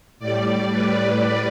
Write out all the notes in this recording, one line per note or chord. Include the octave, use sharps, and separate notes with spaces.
A2 G3 D5
B4